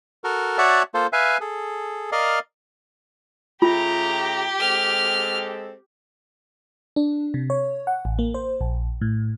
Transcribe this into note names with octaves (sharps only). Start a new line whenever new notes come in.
F#4 A4 A#4
F#4 C#5 D5 E5 F#5 A5
A#3 F4 A4 C5
B4 E5 F5 G#5
G#4 A4
A#4 D5 D#5 F5
C#3 A3 F4 G4 A#5
G#3 C4 A4 F6
D4
C3
C#5
F#5
A1
A#3
C5
A#1
A2